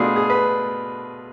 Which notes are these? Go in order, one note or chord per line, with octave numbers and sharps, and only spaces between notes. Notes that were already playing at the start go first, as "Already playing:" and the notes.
Already playing: B2 A3 D4 F4 G#4
G#4
B4